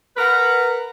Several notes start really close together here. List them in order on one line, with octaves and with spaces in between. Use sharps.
B4 A#4 F#5